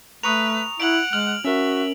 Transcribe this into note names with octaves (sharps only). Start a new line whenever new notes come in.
A3 B4 A#5 C#6 D#6 F7
E4 F#5 D7 F#7
G#3 F6 F#7
C#4 F#4 A#4 E5